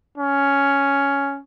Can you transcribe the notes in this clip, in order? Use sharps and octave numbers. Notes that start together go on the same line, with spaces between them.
C#4